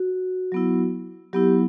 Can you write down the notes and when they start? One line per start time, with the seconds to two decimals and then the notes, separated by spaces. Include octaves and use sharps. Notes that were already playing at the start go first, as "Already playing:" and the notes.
Already playing: F#4
0.52 F#3 B3 E4
1.33 F#3 B3 E4 G4